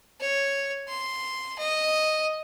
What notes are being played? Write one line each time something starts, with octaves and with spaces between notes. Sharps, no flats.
C#5
C6
D#5